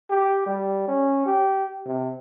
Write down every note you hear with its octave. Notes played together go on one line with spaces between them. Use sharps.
G4
G3
C#4
G4
C3